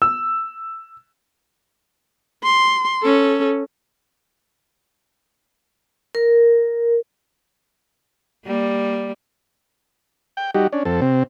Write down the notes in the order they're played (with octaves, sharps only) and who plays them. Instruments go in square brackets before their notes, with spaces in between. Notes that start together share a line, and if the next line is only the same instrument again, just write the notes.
[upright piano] E6
[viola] C6
C#4 A4
[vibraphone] A#4
[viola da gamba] G3 A#3
[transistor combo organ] G5
G3 D#4 F#4 G4
C#4 D4
F2 C4 A4
C3 C4